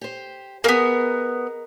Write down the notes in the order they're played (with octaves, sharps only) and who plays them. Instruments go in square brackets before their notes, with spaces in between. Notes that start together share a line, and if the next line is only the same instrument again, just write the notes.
[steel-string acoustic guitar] G4 C5
[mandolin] A#3 B3 [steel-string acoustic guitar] G#4 A#4 D#5